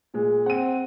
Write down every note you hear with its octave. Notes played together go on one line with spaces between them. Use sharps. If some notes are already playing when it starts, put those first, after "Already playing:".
A#2 G#3
C4 F#5 D#7